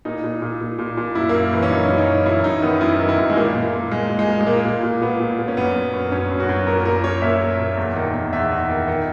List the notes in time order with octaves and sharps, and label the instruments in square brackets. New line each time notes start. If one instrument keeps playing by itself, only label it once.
[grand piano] A#2 D#4
A#2
A#2
A#2
A#2
A#2
F#2 E4
F#2 A#3
E3
C#4
F#2 D#4
F#2
D#4
E3
F#2 E4
F#2 D#4
D#3 B3
F#2 E4
D#3
E4
F#2
G#3
A#2 A#3
A#2
A#2
A#2 G#3
A#2
G#3
A#2
G#3
A#2 A#3
A#2
A#2
A#2 B3
A#2
A#2
C#4
F#2 B3
F#2
F#2
F#2 C#4
F#2
F#4
F#2
A#2 A#4
A#2 A#4
A#2 C#5
A#2 E5
A#2
A#2
E2
D#3
E2
E2 E5
E2
D#3
D#3